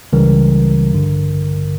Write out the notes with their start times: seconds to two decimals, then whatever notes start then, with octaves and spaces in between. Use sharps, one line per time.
0.13 C#2 C#3 E3 G3 A#4
0.91 A1 G2 D3